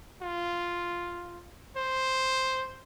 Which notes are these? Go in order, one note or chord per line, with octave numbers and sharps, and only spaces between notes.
F4
C5